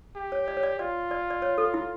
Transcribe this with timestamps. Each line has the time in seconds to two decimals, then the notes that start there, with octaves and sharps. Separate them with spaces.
0.16 G4
0.32 C#5
0.48 D5
0.57 C#5
0.63 D5
0.79 F4 D5
1.11 D5
1.30 D5
1.42 C#5
1.58 A4
1.74 E4